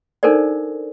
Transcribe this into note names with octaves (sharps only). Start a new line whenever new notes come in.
D4 D#4 A4 A#4 C5 D5